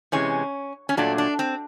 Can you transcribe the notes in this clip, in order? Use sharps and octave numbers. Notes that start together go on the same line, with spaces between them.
C3 E3 G#3 C#4
C#4
A#2 F#3 A3 D4
D4
C4